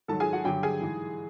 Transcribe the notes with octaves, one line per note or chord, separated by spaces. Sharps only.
G#2 D#3 F#3 A4 A5
G#4 G#5
F#4 F#5
G2 D3 F#3 G4 G5
G#4 G#5
G#2 E3